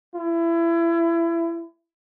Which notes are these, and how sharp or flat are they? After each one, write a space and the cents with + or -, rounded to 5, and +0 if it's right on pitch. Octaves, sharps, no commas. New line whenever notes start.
E4 +25